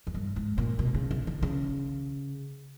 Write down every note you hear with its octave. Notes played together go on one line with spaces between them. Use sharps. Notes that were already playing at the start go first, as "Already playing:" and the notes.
E2
G2
G#2
A#2
B2
C#3
C#3
D#3
C#3